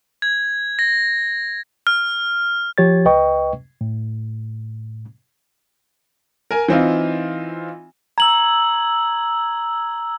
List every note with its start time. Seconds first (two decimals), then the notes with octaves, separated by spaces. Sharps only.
0.22 G#6
0.79 A#6
1.87 F6
2.78 F3 G4 C#5 G#6 A6
3.05 C#2 B4 D#5 G5 C#6
3.81 A2
6.51 A#4 G#5
6.68 E3 C4 D#4 F4
8.18 A#5 E6 G#6 F#7